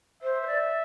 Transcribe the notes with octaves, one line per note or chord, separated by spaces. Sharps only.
C5 E5
C5
D5